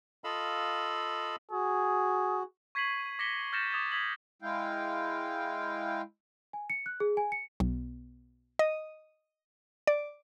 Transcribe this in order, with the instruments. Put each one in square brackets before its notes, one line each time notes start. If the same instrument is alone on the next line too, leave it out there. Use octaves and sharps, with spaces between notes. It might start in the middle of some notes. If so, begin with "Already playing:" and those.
[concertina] F4 A4 D#5 F5 B5 E6
[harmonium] F#4 [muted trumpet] G#4
[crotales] C#6 G#6 B6 C7 D#7 F#7
D6 A#6 B6 C#7 G7
F6 G6 A6 A#6 C#7 E7
D6 D#6 G#6 A6 E7
D#6 G#6 B6 F#7
[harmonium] G#3 E4 F5 G5
[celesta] G#5
C#7
F#6
G#4
G#5
C#7
[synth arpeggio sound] B1
D#5
D5